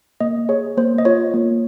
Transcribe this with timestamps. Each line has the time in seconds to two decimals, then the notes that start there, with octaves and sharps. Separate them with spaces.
0.20 A#3 D#5
0.49 G#4 C#5
0.77 A#3 C5
0.98 D#5
1.05 F4 C#5
1.34 A#3